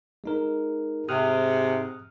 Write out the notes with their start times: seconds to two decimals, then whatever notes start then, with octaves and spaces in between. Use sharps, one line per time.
0.24 G#3 D#4 A#4
1.09 G#2 C3 D#6 F6 F#6